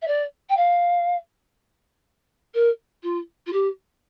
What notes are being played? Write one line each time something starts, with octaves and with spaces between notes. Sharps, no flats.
E5
D5
G5
F5
A#4
F4
F4
G4